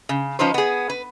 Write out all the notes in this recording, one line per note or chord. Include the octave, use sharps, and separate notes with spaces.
C#3
F3 C#4 D#4 B4 C5
B3 G#4
B4